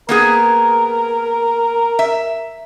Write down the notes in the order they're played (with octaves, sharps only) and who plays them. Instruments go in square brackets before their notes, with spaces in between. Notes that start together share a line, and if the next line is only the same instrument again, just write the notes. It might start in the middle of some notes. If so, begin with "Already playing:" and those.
[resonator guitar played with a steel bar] A#3 B3 G#4 [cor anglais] A#4
[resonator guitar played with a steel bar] E5